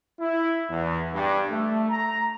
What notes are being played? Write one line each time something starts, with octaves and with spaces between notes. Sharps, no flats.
E4
E2
G2
A3
A#5